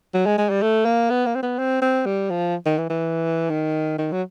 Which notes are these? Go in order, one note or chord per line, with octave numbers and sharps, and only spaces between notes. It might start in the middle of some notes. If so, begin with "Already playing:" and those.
F#3
G#3
G#3
G3
A3
A#3
B3
A#3
C4
B3
C4
C4
G3
F3
D#3
E3
E3
D#3
D#3
F#3